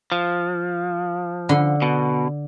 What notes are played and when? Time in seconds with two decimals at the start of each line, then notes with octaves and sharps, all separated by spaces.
0.12 F3
1.49 D3
1.82 B2